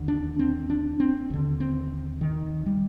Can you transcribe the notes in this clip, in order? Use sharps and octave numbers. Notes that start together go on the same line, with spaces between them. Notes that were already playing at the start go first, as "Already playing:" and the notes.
Already playing: D#2 D3
D4
C4
D4
C4
D#2 D3
C4
D#3
G3